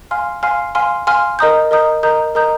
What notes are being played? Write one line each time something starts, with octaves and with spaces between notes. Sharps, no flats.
F5 G#5 C6 F6
F5 G#5 C6 F6
F5 G#5 C6 F6
F5 G#5 C6 F6
A#4 D#5 A#5 D#6 G6
A#4 D#5 A#5 D#6 G6
A#4 D#5 A#5 D#6 G6
A#4 D#5 A#5 D#6 G6